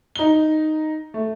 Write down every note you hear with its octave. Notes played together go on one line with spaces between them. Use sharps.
D#4 G7
A3